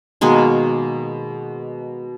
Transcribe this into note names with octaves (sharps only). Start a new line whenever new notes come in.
B2 D#3 G#3 A#3